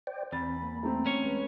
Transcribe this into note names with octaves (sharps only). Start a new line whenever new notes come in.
C5 D5 G5
E2 C4 B5 A6
A#3
A3 C4 A#5
C#4 C#5
G#3 B4